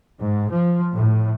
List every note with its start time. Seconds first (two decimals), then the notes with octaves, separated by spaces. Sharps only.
0.21 G#2
0.52 F3
0.95 A2